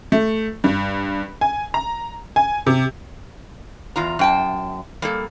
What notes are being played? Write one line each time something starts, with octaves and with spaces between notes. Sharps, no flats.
A3
G2
G#5
A#5
G#5
C3
E2 F4 A#5
F#2 G5 A5
G3 A#3 A4